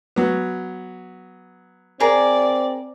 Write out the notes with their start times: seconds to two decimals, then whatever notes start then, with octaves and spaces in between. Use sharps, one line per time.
0.16 F#3 B3
2.00 C4 G#4 A#4 D5